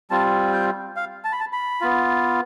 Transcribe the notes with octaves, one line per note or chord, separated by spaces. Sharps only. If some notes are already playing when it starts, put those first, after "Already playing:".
G3 C4 F4 A5
G5
F5
A5
B5
A5
B5
B3 F4